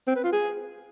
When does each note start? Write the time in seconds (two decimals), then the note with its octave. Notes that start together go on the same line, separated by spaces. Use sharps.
0.07 C4
0.16 B4
0.24 F4
0.32 G#4